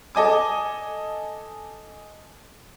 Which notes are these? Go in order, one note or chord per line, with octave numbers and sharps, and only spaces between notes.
A4 D#5 G#5 D6